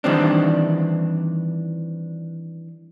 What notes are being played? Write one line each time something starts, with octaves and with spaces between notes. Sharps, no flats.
D#3 E3 G3 C4 D4